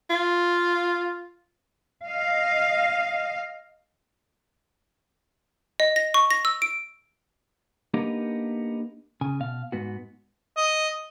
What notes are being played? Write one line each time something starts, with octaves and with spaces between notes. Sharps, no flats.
F4
D#5 F5
D#5
A#6
C#6
A#6
E6
D7
A#3 B3 D4 D#4 G4 A#4
C#3 G#5
B2 F5
G#2 B3 F#4
D#5